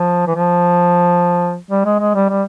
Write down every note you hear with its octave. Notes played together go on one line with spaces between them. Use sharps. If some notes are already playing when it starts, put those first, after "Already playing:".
Already playing: F3
E3
F3
G3
G#3
G#3
G3
G3